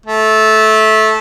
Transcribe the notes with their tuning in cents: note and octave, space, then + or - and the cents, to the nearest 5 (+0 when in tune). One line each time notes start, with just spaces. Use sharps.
A3 -15